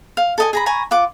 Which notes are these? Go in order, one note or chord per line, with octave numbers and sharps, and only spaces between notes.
F5
A4 D#5 G#5
G#4 A#5 B5
G#5 A#5 B5 C#6
F4 F#5 D6